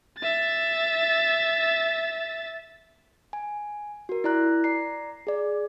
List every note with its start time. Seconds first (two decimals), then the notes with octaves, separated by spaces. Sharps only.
0.18 E5 A6
3.33 G#5
4.09 F#4 A#4
4.24 E4 D5 A#5 F#6
4.64 D5 A#5 C7
5.27 G#4 D5